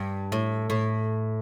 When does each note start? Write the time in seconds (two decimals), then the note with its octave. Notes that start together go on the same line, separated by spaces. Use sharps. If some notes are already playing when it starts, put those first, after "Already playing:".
Already playing: G2
0.32 A2
0.70 A2